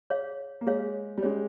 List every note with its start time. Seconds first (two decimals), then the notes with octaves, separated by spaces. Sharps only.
0.10 G#4 C#5 F5
0.61 A#3
0.67 G#3 G#4 C#5 F5
1.18 G3
1.23 G#3 C#4 G#4 C#5